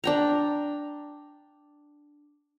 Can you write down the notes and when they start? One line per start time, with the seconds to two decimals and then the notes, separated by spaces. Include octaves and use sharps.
0.04 D4 G5 A#5